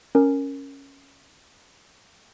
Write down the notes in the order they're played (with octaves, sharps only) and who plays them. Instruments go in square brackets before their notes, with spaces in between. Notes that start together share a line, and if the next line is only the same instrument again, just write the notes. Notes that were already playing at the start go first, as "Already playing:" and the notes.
[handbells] C#4 A#4